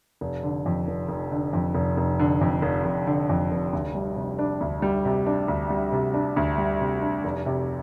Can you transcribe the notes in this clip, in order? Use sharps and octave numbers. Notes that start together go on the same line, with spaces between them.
F1
D3
F2
F1
F1
D3
F2
F1
F1
D3
F2
F1
F1
D3
F2
F1
D2
G3
C3
D4
D2
G3
C3
D4
D2
G3
C3
D4
D2
G3
C3
D4
F1
C3